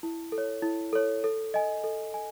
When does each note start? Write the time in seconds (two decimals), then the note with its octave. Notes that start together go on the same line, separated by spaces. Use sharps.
0.03 E4
0.32 A4
0.38 C#5
0.62 E4
0.93 A4 C#5
1.24 A4
1.54 D#5 G#5
1.84 A4
2.14 G#5